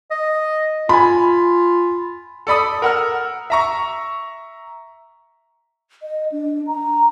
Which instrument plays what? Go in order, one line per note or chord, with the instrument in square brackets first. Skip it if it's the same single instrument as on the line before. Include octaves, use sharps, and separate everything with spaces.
[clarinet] D#5
[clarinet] F4 [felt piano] G#5 B5
[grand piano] A4 D5 B5 D#6
A#4 F#5 E6 F6
E5 A#5 C#6
[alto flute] D#5
D4
A#5